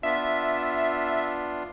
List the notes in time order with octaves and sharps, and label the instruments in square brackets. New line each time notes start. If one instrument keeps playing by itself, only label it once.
[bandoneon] B3 D4 F4 [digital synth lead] E5